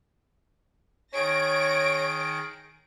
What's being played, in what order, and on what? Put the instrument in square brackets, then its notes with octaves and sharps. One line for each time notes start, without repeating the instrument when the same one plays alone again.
[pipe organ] D#3 G#4 [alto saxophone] C#5 [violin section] A#6 D7